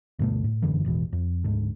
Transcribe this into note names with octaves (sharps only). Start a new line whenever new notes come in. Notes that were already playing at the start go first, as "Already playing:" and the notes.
D2 G2 B2 A3
A2
G1 F#2 D3 E3
A1 E2 B2 E3
F2
D2 G#2 D3